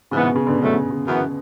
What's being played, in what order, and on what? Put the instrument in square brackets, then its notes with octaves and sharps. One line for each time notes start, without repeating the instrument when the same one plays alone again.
[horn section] G#2 E3 B3 [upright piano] C#3
[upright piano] B2
C#3
B2 D3
[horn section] G#2 F#3 A3 [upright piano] B2 D3
[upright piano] C#3
C#3
[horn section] F#2 E3 B3